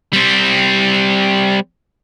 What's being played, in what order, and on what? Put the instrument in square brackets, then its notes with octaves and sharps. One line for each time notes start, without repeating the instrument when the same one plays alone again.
[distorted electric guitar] G3 C4